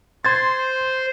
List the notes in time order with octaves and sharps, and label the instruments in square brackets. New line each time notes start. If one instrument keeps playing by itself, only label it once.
[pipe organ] C5 [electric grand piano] C6 G#6 A6